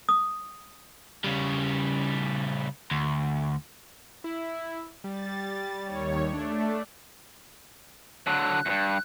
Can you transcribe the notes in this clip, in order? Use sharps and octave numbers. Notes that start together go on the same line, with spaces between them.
D#6
C#3 G3
D2
E4
G3 A6
D#2 C#5
A3 D4
D3 F#3 F#6
E2 G2